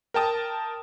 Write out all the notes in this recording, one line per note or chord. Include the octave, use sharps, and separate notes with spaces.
A#4 G5 A5 D#6